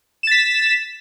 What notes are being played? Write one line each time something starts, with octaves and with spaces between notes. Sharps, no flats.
A6 B6 E7